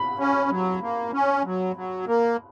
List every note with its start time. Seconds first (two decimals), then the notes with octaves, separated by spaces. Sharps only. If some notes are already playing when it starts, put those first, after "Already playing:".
Already playing: B5
0.19 C#4
0.50 F#3
0.82 A#3
1.14 C#4
1.45 F#3
1.76 F#3
2.07 A#3